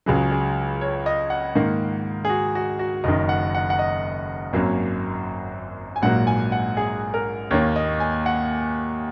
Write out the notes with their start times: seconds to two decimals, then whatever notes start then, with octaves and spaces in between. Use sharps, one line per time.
0.06 C#2 C#3 F#3 G#4
0.32 G#4
0.81 C#5
1.06 D#5
1.30 F#5
1.55 G#2 D#3 A#3
2.25 G#4
2.29 F#4
2.55 F#4
2.79 F#4
3.04 F#1 F#2 D#3 D#5
3.29 F#5
3.55 F#5
3.70 F#5
3.79 D#5
4.53 G#1 F#2 F#3 A#3 C#4
5.96 G#5
6.02 A#1 G#2 F#3 A#3 F#5
6.27 G#5
6.52 F#5
6.77 G#4
7.14 A#4
7.51 D#2 D#3 A#3 C#5
7.76 D#5
8.00 G#5
8.26 F#5